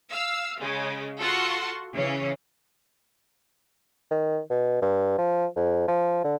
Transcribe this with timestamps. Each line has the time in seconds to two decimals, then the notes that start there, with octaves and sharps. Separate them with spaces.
0.11 F5 E6
0.59 C#3 G#3
1.19 F4 F#4 A4 F#5 C6 C#6
1.95 C#3 E3 C#4
4.11 D#3
4.50 B2
4.82 G2
5.18 F3
5.56 F2
5.88 F3
6.24 D3